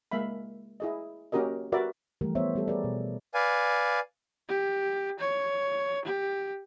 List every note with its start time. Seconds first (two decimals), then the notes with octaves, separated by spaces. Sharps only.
0.11 G#3 A#3 E5 F5 B5
0.80 E4 G#4 D#5
1.32 A#3 C#4 F#4 G4 A#4 D#5
1.72 F#4 G4 A#4 B4 D5 E5
2.21 E3 F3 G3 A3 G4 A#4
2.35 B3 C5 C#5 E5
2.55 G3 B3 G4 A4
2.68 G#4 A#4 B4 D5
2.84 B2
3.34 B4 D5 F5 G#5
4.48 G4
5.20 C#5
6.05 G4